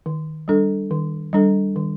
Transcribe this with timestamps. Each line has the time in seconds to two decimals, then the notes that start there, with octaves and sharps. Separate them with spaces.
0.06 D#3
0.48 G3 D4 A4
0.91 D#3
1.33 G3 D4 A4
1.76 D#3